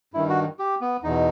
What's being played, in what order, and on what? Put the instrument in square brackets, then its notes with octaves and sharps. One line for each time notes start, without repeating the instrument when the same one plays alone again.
[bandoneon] G2 D#3 E4
F#4
G4
B3
E2 B2 D#4